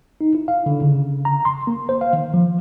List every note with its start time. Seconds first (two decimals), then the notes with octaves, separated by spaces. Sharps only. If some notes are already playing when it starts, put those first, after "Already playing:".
0.21 D#4
0.35 E4
0.48 F5
0.66 D3
0.82 C#3
1.25 A#5
1.45 C6
1.67 A#3
1.89 C5
2.01 F5
2.13 D#3
2.34 F3